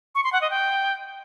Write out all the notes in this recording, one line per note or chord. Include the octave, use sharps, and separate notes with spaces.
C#6
C6
F#5
D#5
G5